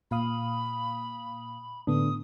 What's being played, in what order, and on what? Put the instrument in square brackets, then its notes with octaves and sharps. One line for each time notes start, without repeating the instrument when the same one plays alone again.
[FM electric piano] A#2 F5 D#6 [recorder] B5
[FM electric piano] A2 B3 [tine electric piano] D3 D4 [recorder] D#6